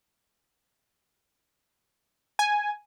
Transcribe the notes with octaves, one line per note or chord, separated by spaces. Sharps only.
G#5